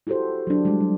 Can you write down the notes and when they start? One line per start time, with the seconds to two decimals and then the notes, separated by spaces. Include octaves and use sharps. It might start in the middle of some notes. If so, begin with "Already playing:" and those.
0.07 E4 F#4 G4 A4 C5
0.47 F#3 D4
0.65 G3 G#3
0.81 F#3